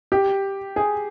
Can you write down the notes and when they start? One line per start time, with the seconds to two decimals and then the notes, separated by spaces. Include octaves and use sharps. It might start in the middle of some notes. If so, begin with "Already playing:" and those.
0.12 G4
0.76 G#4